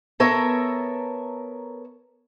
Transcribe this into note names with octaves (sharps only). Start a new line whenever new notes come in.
B3 A4 A#4 C#5 E5 A#5